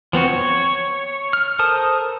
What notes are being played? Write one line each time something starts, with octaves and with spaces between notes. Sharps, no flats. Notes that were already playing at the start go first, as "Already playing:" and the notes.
F3 B3 C4 F#4
C#5
F6
A4 A#4 C5 A5 D#6